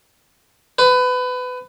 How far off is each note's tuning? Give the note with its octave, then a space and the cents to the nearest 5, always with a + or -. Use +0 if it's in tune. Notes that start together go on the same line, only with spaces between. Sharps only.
B4 +25